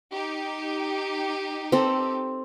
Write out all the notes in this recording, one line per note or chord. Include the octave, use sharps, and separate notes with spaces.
D#4 G4
C4 A4